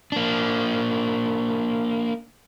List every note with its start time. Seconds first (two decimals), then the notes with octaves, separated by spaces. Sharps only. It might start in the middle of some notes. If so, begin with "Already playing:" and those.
0.12 A#3 D4